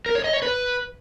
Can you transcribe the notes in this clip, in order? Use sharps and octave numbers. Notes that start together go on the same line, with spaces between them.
A#4
C#5
D#5
C#5
B4